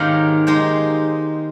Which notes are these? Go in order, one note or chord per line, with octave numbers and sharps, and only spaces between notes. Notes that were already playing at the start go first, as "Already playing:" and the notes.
Already playing: G#2 D#3 A#3 C#4 G4
G#3 D#4 G4 C5